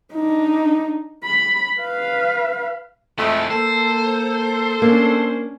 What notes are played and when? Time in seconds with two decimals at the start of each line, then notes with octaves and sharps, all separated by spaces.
0.14 D4 D#4
1.24 B5
1.81 B4 F5
3.18 F2 E3 G#3 A3
3.50 A#3 A4 C5
4.82 A#3 C#4 D4